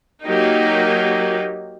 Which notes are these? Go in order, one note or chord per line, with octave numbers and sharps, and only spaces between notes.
F#3 A#3 D#4 G4